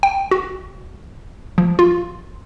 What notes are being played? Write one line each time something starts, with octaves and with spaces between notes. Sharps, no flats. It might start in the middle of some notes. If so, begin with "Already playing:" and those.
G5
F#4
F3
F4